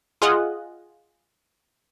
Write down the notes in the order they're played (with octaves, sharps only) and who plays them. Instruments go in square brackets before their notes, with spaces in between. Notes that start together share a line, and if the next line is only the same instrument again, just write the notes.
[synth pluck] F4 G#4 D#5 F#5